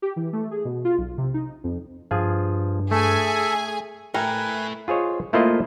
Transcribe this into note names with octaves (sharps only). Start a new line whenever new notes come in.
G4
E3
A3
G#4
B2
F4
B1
C3
D#4
F2
G2 F3 F4 G#4
A3 G#4 A4 E5 G#5
A3 E4 A#4 B4 G5 G#5 A#5
F4 G#4 C5 C#5 D#5
A3 A#3 E4 F4 C5 D#5